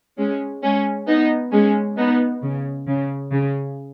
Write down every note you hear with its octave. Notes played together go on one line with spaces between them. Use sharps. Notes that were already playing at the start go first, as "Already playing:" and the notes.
G#3 C#4
G#3 C#4
B3 D#4
G#3 C#4
B3 D#4
C#3
C#3
C#3